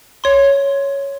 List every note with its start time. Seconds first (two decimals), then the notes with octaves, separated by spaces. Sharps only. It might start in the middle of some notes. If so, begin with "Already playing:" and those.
0.24 C#5 C6